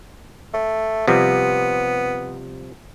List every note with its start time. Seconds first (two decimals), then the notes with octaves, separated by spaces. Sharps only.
0.54 A3
1.08 C3 F3 G3 B3